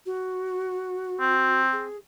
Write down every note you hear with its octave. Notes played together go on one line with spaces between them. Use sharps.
F#4
C4
G#4